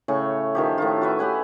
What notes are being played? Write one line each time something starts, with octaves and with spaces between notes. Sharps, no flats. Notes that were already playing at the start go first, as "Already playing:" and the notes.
A2 C#3 C#5 C#6
D#3 F3 G4
A2 D#3 F4
F#4 B4 E5
G4 B4 F#5 G#5